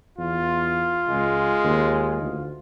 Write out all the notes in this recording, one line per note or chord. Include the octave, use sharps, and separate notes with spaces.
E2 F4
C#2 G#3
D#2
D2